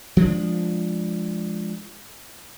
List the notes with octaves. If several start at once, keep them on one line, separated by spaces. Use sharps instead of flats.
F3 G#3 A3 D4